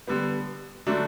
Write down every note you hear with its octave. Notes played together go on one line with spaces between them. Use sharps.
D3 G3 B3
D3 F#3 A3 D4